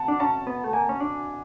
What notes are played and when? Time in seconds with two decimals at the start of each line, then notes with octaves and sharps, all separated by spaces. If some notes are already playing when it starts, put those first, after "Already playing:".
Already playing: F#5 A5
0.08 D4
0.20 C#4 A5
0.47 B3
0.64 A3
0.73 A#3 G#5
0.89 C#4
1.00 D4